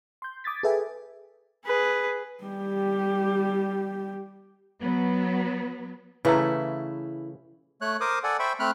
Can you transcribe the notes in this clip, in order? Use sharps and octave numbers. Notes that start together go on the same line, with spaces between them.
C6 G6
D6 D#6 G#6 A6 B6
G#4 A4 B4 E5 G5 G#5
G#4 B4
G3 G4
F#3 B3
C#3 E3 A3 E4 B4 A#5
A3 C#5 F#6
A#4 C5 D6 D#6
A4 D5 F#5 G#5
C5 E5 G5 B5 C#6
A3 C4 B5 F6 F#6